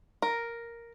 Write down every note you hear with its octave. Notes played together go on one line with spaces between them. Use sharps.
A#4